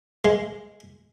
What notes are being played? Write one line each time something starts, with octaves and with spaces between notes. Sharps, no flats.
G#3